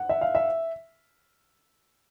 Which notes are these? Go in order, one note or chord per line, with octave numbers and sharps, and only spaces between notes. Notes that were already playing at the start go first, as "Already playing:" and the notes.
Already playing: F#5
E5
F5
E5